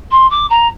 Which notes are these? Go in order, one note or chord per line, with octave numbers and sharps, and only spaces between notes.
C6
D6
A#5